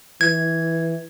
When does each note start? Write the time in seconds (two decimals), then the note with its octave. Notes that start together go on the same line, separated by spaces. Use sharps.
0.21 E3 G#6